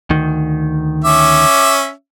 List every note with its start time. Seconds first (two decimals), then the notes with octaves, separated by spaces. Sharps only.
0.10 D2 D#3
1.04 C#4 E5 D6